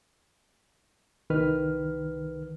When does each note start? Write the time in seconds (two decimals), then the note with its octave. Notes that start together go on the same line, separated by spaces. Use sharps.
1.30 C2 D#3 B4 F6